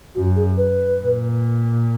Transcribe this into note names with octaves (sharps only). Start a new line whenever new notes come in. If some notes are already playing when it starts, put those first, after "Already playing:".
F#2 F#4
G#4
B4
A#2